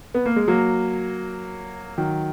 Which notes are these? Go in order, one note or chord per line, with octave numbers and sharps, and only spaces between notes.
B3
A#3
G#3
F#3 A#3
D#3 F#3